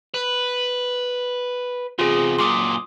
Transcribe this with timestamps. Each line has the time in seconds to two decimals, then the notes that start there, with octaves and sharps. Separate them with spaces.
0.14 B4
1.99 E2 C3 F4 G#4
2.39 F#2 A#2 C6 D6 D#6